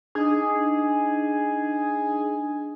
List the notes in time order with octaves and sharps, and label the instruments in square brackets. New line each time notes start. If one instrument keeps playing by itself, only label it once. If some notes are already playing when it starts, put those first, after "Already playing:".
[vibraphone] D4 D#4 D#5 [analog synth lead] G#4